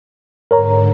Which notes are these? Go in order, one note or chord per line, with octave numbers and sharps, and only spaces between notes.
G#2 D3 A#4 C#5 A#5